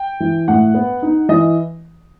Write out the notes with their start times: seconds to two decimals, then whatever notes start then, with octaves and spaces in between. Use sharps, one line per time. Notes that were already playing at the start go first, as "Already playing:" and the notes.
Already playing: G5
0.20 E3
0.48 A2 F#5
0.74 B3
1.02 D#4
1.29 E3 D#5